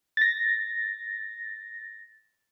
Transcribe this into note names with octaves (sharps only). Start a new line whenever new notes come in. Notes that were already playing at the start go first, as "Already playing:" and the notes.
A6 A#6